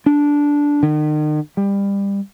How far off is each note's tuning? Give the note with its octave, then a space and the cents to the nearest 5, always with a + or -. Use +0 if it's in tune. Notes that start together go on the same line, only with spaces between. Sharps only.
D4 -10
D#3 -40
G3 +25